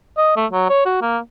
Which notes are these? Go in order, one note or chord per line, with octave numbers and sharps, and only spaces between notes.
D#5
A3
F#3
C#5
F#4
A#3